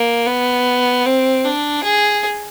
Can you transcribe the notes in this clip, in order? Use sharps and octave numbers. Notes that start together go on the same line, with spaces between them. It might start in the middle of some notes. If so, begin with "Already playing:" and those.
Already playing: A#3
B3
C4
D4
G#4